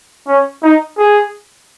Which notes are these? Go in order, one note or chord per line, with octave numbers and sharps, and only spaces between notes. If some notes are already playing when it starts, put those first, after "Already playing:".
C#4
D#4
G#4